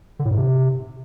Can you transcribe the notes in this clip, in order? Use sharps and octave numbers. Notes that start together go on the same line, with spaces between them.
D3
A2
G#2
C3